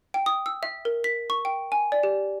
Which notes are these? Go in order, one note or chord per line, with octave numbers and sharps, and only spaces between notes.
G5
D#6
E6
E5
A#4
B6
C#6
G5
G#5
D5
G4